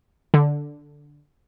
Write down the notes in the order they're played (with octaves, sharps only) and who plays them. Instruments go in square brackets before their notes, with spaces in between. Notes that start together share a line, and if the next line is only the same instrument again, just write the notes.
[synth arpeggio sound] D3